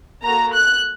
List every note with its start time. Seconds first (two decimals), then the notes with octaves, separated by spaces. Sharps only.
0.23 A#3 F#4 A4 A#5
0.54 F#6